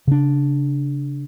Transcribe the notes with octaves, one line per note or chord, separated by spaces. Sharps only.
C#3 D4